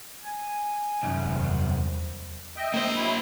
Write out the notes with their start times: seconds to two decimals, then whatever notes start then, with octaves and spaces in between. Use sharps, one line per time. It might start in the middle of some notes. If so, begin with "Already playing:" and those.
0.23 G#5
1.03 C2 F#2 C#4 D#4
1.26 E2 D#3 B3 C5
2.56 D#5 E5 G5
2.74 A#3 C5
2.95 F#3 E4